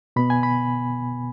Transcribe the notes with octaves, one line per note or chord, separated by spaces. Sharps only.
B2 B3 B5
G#5
B5